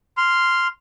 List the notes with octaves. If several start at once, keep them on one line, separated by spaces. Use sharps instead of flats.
C6 F6